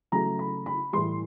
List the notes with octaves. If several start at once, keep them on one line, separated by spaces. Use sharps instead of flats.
C#3 F#3 A3 A#5
B5
B5
A2 E3 G3 C6